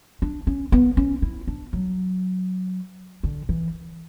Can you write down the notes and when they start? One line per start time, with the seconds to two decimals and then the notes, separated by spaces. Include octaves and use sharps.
0.22 D4
0.47 C#4
0.72 B3
0.97 C#4
1.22 E4
1.47 D4
1.73 F#3
3.23 D3
3.49 E3